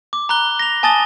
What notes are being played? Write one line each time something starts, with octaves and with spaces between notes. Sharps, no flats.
D6
A#5 B5 F#6 G7
A#6 F7
G#5 A5 D#6 A6 G7